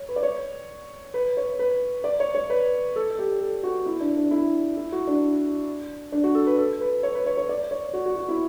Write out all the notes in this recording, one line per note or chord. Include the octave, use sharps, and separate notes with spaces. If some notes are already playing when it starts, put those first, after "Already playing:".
Already playing: C#5
B4
D5
C#5
B4
C#5
B4
D5
C#5
C#5
B4
A4
A4
G4
A4
F#4
E4
D4
D4
E4
E4
F#4
D4
D4
F#4
A4
B4
A4
B4
C#5
B4
C#5
C#5
D5
C#5
F#4
F#4
F#4
E4